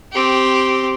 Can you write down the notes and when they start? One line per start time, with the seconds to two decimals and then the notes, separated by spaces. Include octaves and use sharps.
0.12 C4 G4